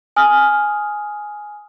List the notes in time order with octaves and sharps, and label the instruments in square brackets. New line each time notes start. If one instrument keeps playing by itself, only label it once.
[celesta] G#5 D#6 F6